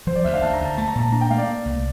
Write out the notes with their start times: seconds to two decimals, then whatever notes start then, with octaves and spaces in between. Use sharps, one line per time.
0.07 F3 C5
0.16 D5
0.24 D2 E5
0.34 F5
0.42 D2 A5
0.53 A#5
0.60 D2 A5
0.77 A3 A5
0.88 A#5
0.95 A#2 A5
1.12 D4 A#5
1.21 G5
1.31 A3 F5
1.38 D5
1.48 A#3
1.65 C2